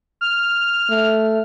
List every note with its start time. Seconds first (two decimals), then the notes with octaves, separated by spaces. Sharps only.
0.21 F6
0.90 A3